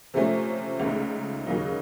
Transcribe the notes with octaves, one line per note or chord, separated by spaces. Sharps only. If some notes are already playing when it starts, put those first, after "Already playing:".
C3 F3 A3 C#4
C#2 C#3 A3 D#4
D#2 C#3 F#3 A#3 D#4